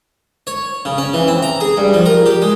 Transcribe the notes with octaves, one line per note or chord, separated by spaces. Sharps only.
C#5
C#3
C#4
E3
C4
A#5
G#4
G2
F3
A#4
G4
G#3